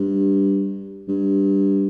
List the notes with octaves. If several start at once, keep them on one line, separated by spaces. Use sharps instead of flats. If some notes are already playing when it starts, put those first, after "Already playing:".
Already playing: G2
G2